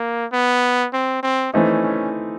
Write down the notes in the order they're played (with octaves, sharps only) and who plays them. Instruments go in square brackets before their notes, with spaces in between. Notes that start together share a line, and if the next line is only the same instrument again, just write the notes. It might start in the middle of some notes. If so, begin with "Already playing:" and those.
Already playing: [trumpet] A#3
B3
C4
C4
[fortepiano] E3 A3 C4 D#4 [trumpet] C#4
[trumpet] C#4